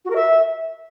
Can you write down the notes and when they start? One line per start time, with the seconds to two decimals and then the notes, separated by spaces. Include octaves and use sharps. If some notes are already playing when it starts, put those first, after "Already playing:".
0.05 F#4
0.10 A#4
0.15 E5